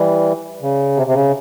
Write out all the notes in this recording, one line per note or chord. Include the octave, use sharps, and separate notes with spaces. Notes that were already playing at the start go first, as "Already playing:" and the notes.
Already playing: E3 G3
C#3
C3
C3
C#3